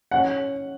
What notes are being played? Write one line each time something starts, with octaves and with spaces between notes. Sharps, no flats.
C#4 F#5